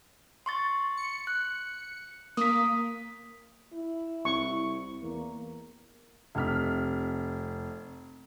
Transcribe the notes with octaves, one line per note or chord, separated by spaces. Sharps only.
C6 C#6 A6
C#7
F#6
A#3 D#6 B6
E4
C2 C#6
E2 A#3
F1 C3 F6 B6